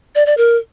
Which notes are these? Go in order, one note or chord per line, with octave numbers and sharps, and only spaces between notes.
D5
D5
A#4